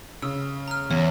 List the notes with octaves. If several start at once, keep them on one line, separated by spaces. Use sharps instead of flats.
C#3 E6
A#5 F6
E2 C#5